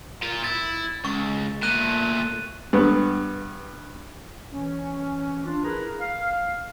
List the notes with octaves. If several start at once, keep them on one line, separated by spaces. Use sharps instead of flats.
A#2 F4
E4 A6
C#2 C#6
A#2 A3 F#6 D#7
G2 B3
E3 C#4
D4 F4
E4 G#4 A#4 B4 A#5 B5
F5